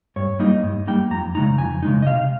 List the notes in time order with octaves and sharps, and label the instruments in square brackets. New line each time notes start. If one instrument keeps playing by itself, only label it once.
[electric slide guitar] G2 C#5
G3 A#3 D#4 D#5
G2
G3 A#3 D#4 G5
F2 A#5
C#3 G#3 D#4 A#5
F2 G#5
C#3 G#3 D#4
D#5
C3 F5